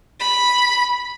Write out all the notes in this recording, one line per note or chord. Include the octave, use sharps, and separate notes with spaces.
B5